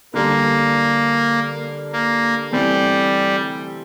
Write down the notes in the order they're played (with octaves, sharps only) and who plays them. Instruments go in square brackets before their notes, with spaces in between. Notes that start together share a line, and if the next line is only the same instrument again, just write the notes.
[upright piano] D3 G3 D4 [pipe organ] A#3
[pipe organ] A#3
[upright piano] C3 E3 A3 C4 [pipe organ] G3